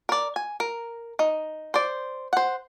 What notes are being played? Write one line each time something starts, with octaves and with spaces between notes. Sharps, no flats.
A#4 D5
G#5
A#4
D#4
C5 D5
C5 F#5